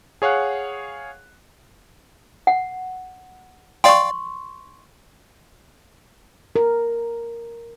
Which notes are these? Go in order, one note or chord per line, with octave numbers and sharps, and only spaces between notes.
G#4 C#5 F5 F#5 F#6
F#5
D5 F5 G5 C6 C#6
A#4